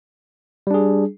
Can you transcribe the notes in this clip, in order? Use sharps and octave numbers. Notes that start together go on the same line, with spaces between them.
G3 D4 G#4